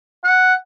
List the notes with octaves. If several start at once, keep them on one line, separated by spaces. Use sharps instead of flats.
F#5